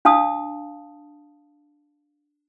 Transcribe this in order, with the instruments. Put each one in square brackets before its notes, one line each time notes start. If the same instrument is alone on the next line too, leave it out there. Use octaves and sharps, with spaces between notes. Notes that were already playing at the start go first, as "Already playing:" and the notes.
[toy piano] D4 F5 A5 D#6